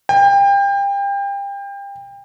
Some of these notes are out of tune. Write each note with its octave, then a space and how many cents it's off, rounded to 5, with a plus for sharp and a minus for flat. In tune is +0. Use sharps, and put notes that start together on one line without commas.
G5 +30